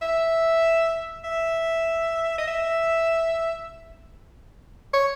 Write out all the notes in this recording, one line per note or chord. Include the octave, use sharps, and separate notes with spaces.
E5
E5
D#5
E5
C#5